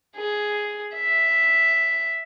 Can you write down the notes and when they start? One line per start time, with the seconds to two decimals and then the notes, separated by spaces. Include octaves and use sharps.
0.16 G#4
0.95 E5